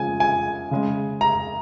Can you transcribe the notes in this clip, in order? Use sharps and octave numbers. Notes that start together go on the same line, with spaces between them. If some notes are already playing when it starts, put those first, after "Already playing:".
Already playing: C#3 F3 G#3 G#5
G#5
C#3 G#3
A#5